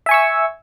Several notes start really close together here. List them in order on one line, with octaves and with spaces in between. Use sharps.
E5 G#5 C#6 E6